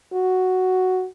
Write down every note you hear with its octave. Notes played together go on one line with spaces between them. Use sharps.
F#4